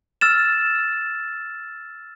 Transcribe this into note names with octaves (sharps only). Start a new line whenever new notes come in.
E6 F6 A6 E7